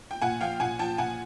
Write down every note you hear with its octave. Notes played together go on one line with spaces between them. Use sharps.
G5
A#2 F#5 G#5
F3 F5 G5
A#2 F#5 G#5
F3 G5 A5
A#2 F#5 G#5